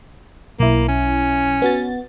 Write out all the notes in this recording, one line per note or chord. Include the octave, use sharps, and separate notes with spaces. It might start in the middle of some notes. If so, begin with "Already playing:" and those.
B1 A#3 E4
C#4
B3 F#4 A6